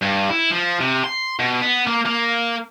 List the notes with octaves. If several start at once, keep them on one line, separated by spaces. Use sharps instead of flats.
G2
E4
F3
C3
C6
B2
B3
A#3
A#3